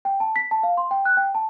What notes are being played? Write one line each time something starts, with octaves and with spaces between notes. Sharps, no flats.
G5
A5
B6
A5
F5
C6
G5
F#6
G5
A5